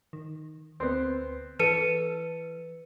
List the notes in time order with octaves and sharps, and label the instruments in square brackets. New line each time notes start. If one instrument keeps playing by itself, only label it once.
[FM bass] D#3
[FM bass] D2 [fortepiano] B3 C4
[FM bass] E3 [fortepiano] A4 [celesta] B4 C#7 D#7